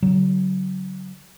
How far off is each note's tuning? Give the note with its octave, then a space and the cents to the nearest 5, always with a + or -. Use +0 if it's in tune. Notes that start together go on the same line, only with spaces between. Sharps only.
D3 -35 F#3 +20